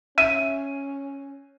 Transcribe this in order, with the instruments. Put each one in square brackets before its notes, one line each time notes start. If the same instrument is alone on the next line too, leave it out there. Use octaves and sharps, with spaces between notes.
[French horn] C#4 [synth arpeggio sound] E5 [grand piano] D#7